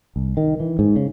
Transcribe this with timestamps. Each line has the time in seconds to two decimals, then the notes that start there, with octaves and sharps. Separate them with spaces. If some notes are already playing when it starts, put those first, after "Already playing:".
0.16 C2
0.37 D#3
0.60 E3
0.79 G#2
0.96 C#3